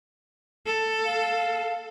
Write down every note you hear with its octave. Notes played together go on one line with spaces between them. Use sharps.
A4
F5